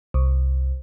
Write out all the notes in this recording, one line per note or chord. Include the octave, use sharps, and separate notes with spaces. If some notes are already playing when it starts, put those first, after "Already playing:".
C2